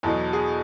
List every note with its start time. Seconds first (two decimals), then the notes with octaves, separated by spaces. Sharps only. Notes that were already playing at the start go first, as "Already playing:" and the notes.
0.03 E2 B2 F#3 A4
0.33 G#4